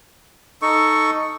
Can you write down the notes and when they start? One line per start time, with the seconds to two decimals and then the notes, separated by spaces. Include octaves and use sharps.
0.62 D#4 A4 C#6